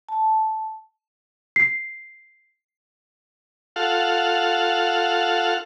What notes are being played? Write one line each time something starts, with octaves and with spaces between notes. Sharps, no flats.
A5
C7
F4 A4 F5 F#5